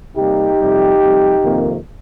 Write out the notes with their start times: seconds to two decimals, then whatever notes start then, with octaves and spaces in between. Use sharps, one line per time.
0.16 C3 G3 A#3 D#4 G4
0.59 F2 C3 G3
1.01 F2 C3 G3
1.43 F2 C3 D#3 A#3